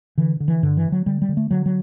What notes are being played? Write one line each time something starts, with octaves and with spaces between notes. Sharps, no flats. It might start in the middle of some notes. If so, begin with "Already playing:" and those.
D3 E3
D3
E3
G2 D3
E3
D3
F#3
D3 G3
G3
D3
A3
D3 F#3
F#3